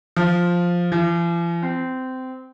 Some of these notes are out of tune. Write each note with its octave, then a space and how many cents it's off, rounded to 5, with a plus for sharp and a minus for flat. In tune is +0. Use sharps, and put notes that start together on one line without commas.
F3 +5
F3 -45
C4 -20